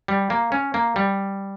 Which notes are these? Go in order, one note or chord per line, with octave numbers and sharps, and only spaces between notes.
G3
A#3
C#4
A#3
G3